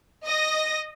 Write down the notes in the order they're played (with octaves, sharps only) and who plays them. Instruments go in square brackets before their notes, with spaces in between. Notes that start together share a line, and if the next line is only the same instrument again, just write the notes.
[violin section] D#5 D#6 A#6